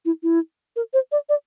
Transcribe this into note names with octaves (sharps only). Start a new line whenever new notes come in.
E4
E4
A#4
C5
D5
D5